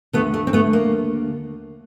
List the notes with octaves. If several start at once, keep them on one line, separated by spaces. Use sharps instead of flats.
D#2 D3 A3 B3
A3
C4
A3 B3
A#3